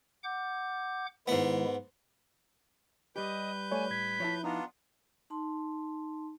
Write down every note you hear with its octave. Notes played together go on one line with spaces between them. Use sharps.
F#5 D6 G6
G#2 D#3 G#3 B3 E4
G3 G4 B4 D#5 G6
A3 C#5 D5 G#5
A2 G#6 B6
F3 E4 C#5 E5 A5
B3 D4 D#4 F4 A#5
D#4 A5 C6